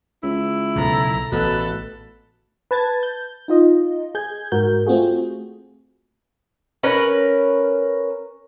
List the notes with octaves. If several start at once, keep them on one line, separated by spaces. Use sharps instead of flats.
C#2 E4
B1 C#3 A4 A#5
A1 B2 A4 B4
B4 A5 G#6 A6
G6
D#4 F4 D#5
G#4 G6 G#6
G#2 F#4 A#4 G6
A3 C4 F4 F#4 G#4
C#4 A#4 B4